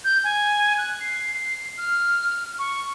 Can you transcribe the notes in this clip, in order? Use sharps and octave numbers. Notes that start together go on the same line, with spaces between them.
G6
G#5
F#6
C7
C7
F6
C#6